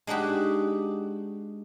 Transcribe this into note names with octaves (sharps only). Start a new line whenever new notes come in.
G#3 D4 D#4 F#4 G4